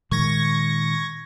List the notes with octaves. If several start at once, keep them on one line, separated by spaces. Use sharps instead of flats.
A#2 D#3 G#3 C#6 G#6 A#6